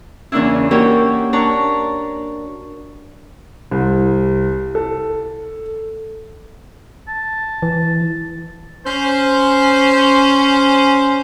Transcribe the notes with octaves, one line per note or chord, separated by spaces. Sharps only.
E2 C#3 A#3 D4 E4
A#3 D#4 F#4 G4 A#4 C#5
D4 A#4 C#5 A5 A#5
C2
A4
A5
E3
C#4 C5